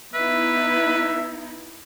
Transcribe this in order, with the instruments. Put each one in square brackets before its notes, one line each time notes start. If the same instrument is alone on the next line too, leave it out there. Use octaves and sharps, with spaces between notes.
[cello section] B3 D#4 E4 [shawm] B4 [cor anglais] E5